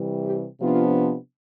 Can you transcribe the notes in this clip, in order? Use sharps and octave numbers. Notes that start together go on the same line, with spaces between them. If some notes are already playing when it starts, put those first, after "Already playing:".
Already playing: C3 E3 G3
G4
C3 F3 B3 D4 F4